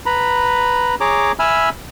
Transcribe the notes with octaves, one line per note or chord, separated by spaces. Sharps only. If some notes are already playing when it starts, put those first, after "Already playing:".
B4 A#5 B5
G#4 C#5 A#5 D6
E5 G#5 B5 E6 F6